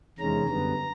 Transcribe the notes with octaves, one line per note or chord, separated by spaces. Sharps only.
E2 C3 D#3 G#3 C#4 A#5
F#2 D3 G3 B3